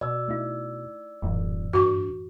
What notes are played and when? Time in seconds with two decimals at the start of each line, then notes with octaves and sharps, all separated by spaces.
0.01 B2 D5 E6
0.28 A3 D#4 E4
1.22 D#1 F#2 A2 E3
1.73 G2 F#4 C#6